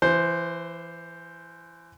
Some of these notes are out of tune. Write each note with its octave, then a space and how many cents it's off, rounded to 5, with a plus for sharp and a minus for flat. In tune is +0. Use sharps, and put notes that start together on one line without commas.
E3 +25 C5 +0